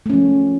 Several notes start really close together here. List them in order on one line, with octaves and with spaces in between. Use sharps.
A3 C#4 F3